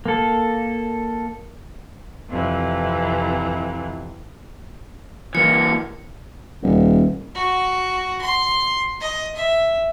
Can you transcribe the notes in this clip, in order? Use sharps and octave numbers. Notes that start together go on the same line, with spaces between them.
A#3 A4
F2 C3 E3
E3 A#3 C#7
D#1
F#4
C6
D#5
E5